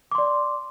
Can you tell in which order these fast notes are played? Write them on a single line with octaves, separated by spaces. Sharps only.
D6 C6 D5